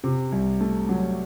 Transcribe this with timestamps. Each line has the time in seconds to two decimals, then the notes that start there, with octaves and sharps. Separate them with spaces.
0.04 C3
0.32 C2
0.61 A3
0.89 F#3